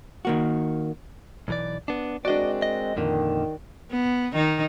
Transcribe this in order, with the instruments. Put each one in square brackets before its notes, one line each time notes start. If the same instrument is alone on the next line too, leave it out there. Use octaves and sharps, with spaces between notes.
[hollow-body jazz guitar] D#3 A#3 F#4
[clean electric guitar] B1 E3 D5
B3 D4
[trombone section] G#3 C4 A#4 [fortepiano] D4 F#4 [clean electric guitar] D5 D#5
[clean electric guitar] D#5
[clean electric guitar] F2 A#2 D3 [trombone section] D#3
[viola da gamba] B3
D#3 D#4